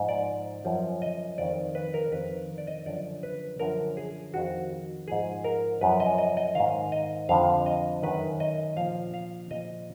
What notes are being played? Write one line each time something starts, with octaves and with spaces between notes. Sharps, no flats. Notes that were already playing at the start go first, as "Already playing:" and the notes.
Already playing: G#2 F3
D5
F#2 F3
D#5
F2 D#3 D5
B4
A#4
F2 D#3 B4
D5
D#5
F#2 D3 F3 D5
B4
F#2 D3 F3 A#4
G#4
F2 D#3 F#4
G#2 F3 G#4
A#4
F#2 F3 B4
D#5
D#5
D#5
G#2 D#3 F5
D#5
F2 D3 F3 F5
D#5
F#2 D#3 B4
D#5
A#2 F3 F5
F5
A#2 F3 D#5